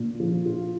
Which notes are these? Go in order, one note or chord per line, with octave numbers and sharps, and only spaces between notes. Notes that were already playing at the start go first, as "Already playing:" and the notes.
Already playing: A#2
F3
F4